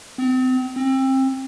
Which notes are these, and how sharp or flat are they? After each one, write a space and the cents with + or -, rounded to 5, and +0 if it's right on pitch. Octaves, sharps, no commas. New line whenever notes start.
C4 -35
C4 +25